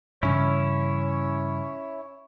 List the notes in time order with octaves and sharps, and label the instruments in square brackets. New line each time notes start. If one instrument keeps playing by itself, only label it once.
[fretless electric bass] G2 C#3 E3 [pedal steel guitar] C#4 E4 [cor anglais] C#5